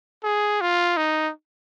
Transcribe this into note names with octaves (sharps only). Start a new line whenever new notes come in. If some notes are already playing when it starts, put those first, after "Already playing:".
G#4
F4
D#4